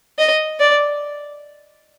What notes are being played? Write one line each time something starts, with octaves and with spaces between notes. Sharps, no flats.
D#5
D5